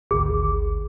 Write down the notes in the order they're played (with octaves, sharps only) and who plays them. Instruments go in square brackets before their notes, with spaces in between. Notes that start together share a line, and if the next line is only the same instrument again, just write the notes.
[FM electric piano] G#1 D2 [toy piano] G#4